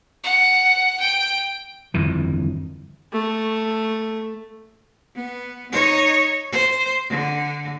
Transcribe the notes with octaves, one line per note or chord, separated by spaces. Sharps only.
F#5
G5
G1 F2 D#3 E3
A3
B3
D#4 C#5
C5
D3